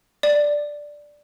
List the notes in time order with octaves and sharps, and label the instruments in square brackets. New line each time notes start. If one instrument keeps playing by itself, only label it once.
[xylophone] D5